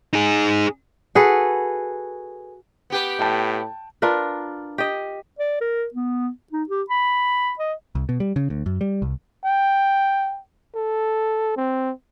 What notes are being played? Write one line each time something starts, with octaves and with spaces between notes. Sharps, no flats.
D#4 G#4
F#4 G#4 A4 B4
B3 G4 B4
A2 G5 A5
D4 F4 A#4 B4
G4 D#5
D5
A#4
B3
D#4
G4
B5
D#5
C2
B2
G3
C#3
D2
F#2
G3
C2
G5
A4
C4